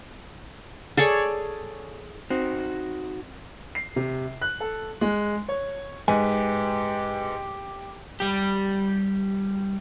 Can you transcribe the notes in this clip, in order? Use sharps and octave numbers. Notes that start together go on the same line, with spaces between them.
G#4 A4 C#5 D5
C4 D#4 F#4
C7
C3
F#6
A4
G#3
C#5
G#2 G4 B4 G#5
G3 G4